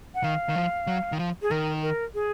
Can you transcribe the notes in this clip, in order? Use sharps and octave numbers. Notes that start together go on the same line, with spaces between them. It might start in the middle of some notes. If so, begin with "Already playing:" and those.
F#5
D#3 F5
D#3
F3
F#3
D#3
F3
G#4
D#3 A#4
A#4
G#4